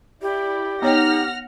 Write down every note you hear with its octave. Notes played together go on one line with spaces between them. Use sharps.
E4 G4 D5
B3 D#4 C#5 F#5 G5 F6 A#6